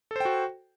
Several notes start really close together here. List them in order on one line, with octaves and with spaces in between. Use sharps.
A4 C5 G5 F#4